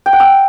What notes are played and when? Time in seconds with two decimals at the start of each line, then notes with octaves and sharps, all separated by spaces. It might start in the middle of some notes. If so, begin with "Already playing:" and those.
0.06 G5
0.13 F#5
0.20 E6